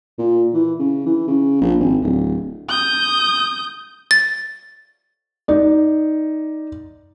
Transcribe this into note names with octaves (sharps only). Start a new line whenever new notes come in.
A#2
E3
C#3
E3
C#3
A#1
G#1
D1
D#6 G6
A6
D#4 D5